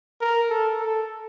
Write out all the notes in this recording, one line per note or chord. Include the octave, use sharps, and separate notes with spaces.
A#4
A4
A4